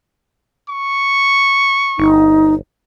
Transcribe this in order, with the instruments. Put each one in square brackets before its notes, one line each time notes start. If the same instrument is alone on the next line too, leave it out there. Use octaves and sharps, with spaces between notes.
[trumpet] C#6
[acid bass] G1 [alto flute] D#4